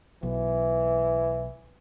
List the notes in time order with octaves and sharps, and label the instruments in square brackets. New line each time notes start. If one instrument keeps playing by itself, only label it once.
[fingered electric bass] B1 [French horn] E3